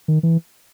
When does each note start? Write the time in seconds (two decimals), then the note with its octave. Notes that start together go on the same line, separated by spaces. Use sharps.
0.08 D#3
0.23 E3